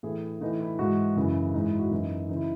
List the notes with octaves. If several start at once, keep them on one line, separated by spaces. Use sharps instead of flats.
A2 E3 G#4
A2 E3 D#4
E4
G#2 E3 F#4
F#2 C#3 E3
G#2 E3 D#4
E4
F#4
F#2 E3 D#4
C#3 E3 D#4
E4